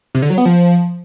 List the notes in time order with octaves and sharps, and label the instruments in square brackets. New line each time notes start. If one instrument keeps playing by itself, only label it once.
[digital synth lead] C3
D3
F#3
B3
F3